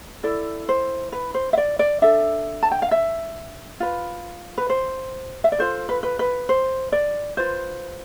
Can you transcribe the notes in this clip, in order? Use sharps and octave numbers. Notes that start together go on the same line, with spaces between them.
E4 A4 D5
C5
B4
C5
E5
D5
D5
D4 A4 E5
A5
G5
F5
E5
F4 B4
B4
C5
E5
D5
F4 A4 C5
B4
B4
B4
C5
D5
F4 B4 C5